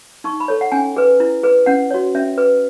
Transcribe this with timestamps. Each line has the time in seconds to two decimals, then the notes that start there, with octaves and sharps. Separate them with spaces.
0.24 D#4 C#6
0.40 B5
0.48 A4 C#5
0.61 F#5
0.72 C#4 G#5
0.96 G#4 B4
1.20 E4
1.43 G#4 B4
1.66 C#4 F#5
1.91 F#4 C#5
2.15 C#4 E5
2.38 G#4 B4